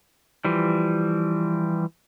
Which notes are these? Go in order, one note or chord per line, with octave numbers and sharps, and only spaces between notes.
E3 F3 G3